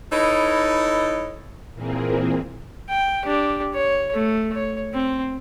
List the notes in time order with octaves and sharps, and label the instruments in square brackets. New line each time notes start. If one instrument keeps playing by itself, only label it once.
[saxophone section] D#4 E4 A4 B4 C#5 D#5
[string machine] A#2 E3 A#3 C4 G#4
[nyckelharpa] G5
D4 G4
C#5
A3
C#5
C4